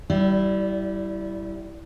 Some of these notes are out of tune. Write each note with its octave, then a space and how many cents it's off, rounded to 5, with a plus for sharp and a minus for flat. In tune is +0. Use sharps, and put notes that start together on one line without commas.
G3 -25 E4 +0 D5 +0